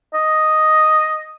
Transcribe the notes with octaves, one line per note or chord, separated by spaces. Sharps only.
D#5